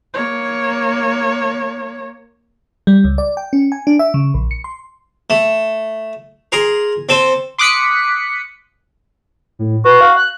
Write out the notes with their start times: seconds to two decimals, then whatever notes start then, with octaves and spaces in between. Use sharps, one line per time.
0.14 A#3 C#5
2.87 G3
3.04 C#2
3.18 D5
3.37 G5
3.53 C#4
3.72 G#5
3.87 D4
3.99 E5
4.14 C#3
4.34 A#1
4.51 C#7
4.64 C6
5.30 A3
6.52 G#4 A#4 C6
7.09 C4 A4 C5
7.58 C6 D6 D#6 F#6 B6 C#7
9.59 A2
9.85 F#4 B4
10.01 F5
10.16 F#6